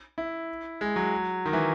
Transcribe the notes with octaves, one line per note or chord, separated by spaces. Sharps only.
E4
G#3
F#3
D#3
E3